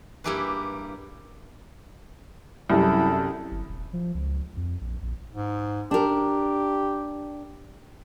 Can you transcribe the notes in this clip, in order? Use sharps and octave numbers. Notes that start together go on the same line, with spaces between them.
G2 A#3 E4 G4 G#4 B4
C2 F#2 C3 E4 A4
G1
D#1
F3
C#2
F2
A#1
A#1
G#2
D4 G4 A#4